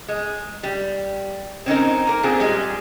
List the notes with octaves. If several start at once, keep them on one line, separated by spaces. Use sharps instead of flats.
G#3
G3
C4 C#4 D#4 A#4
A#3 A#4
A#2 C4 G#4
G3 G#3